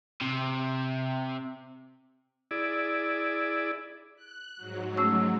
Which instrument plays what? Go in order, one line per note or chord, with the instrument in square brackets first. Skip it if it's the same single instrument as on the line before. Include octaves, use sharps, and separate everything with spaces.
[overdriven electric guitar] C3
[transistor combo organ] E4 G#4 D5
[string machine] F#6
G#2 F#3
[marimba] A3 C#4 E6